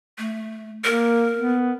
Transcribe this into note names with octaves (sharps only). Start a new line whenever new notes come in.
A3
A#3 A#4
B3